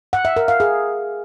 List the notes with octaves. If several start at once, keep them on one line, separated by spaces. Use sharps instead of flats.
F#5
E5
A#4
F5
G#4